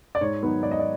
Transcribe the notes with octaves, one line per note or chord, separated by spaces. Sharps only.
D5
G#2 C#5
D#3 F#3 B3 D#4
G#2 D5
D#5
D5